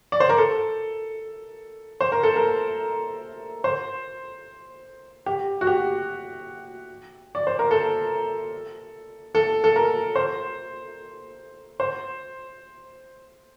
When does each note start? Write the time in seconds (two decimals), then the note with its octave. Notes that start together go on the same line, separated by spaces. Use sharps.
0.12 D5
0.20 C5
0.29 A#4
0.38 A4
2.01 C5
2.12 A#4
2.23 A4
2.36 A#4
3.64 C5
5.26 G4
5.61 F#4
5.67 G4
7.35 D5
7.47 C5
7.59 A#4
7.71 A4
9.35 A4
9.64 A4
9.76 A#4
10.16 C5
11.80 C5